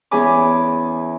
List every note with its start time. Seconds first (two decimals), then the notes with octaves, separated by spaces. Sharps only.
0.11 E2 C#4 G#4 G#5 B5 D6